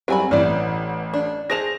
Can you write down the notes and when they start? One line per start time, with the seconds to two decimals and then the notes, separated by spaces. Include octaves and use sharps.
0.08 F#3 G3 C4 G#5 B5
0.31 A1 E3 B3 D5
1.14 D4
1.50 G#4 C5 A5 A#6 F7